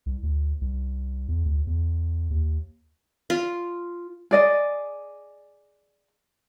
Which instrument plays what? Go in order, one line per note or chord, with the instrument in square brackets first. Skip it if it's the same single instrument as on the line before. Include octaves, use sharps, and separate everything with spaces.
[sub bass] C2
D2
C2
E2
D2
E2
D#2
[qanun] F4
[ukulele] G#4 D5 D#5